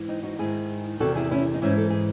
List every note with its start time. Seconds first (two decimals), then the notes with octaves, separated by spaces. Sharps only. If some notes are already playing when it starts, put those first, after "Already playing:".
Already playing: G#2 E3
0.08 C4 D#4
0.23 D#4 F#4
0.39 G#2 D#3 E4 G#4
1.00 E2 C3 D#3 F#4 A4
1.15 E4 G#4
1.31 C#4 E4
1.54 D#4
1.62 G#2 E3 C#4 E4
1.78 A4
1.90 G#4